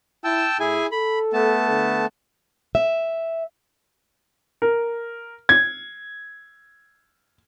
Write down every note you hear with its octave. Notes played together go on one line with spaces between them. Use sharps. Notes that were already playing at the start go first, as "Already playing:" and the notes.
E4 G5 A5 E6
A2 E4 G#4 G#5
A4 B5
A3 B3 A5
D3
E5
A#4
G#6